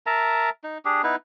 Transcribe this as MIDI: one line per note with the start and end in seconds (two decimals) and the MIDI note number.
0.06 0.50 70
0.06 0.50 76
0.06 0.50 81
0.06 0.50 82
0.64 0.78 63
0.85 1.02 62
0.85 1.02 67
0.85 1.02 68
1.04 1.16 59
1.04 1.16 63
1.04 1.16 64
1.04 1.16 71